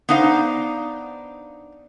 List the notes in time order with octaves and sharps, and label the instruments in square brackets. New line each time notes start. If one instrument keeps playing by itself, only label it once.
[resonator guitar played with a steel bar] B3 D4 D#4 C5 F5